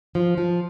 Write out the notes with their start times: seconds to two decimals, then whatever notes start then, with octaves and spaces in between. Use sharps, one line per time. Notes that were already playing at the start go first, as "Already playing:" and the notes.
0.15 F3
0.38 F3